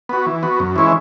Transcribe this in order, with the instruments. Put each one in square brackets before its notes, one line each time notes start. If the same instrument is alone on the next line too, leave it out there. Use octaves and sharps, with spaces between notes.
[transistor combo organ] B3 F#4
E3
B3 F#4
F#2
E3 G#3 C#4 E4